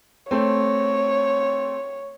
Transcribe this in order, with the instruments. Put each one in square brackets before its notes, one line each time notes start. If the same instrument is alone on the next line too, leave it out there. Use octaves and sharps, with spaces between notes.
[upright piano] A3 C4 [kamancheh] C#5